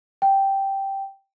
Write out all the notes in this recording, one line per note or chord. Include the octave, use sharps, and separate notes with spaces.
G5